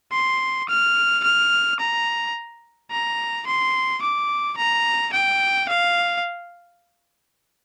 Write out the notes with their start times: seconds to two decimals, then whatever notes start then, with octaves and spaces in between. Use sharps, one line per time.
0.12 C6
0.69 F6
1.24 F6
1.80 A#5
2.91 A#5
3.47 C6
4.03 D6
4.57 A#5
5.14 G5
5.69 F5